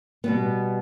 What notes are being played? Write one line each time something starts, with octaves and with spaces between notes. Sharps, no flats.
B2 G3 B3